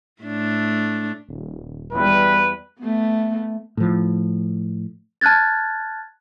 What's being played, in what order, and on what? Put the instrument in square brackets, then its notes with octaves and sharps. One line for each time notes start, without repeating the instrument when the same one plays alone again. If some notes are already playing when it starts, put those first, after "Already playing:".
[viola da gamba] A2 A3 D4
[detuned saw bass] D#1
[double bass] E2 G3 [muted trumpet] B4
[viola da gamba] A3 B3
[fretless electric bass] A2 F3
[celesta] A5 F6 F#6 G#6 A6